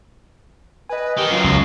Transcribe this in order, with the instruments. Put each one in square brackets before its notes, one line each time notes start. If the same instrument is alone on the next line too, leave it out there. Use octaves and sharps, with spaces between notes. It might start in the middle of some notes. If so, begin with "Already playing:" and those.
[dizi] B4 [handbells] D#5 G#5
[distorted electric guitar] D#3 [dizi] G4
[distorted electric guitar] F#2 F#3 [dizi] F4 [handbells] C7
[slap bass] C#2